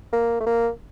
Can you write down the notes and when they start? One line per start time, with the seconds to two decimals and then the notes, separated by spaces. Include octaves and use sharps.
0.13 A#3
0.40 A3
0.46 A#3